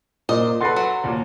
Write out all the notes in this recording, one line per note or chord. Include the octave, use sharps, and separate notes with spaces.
A#2 C5 D#5
F#4 A4 B4 C6 A6 C7
F#3
D#2 A#2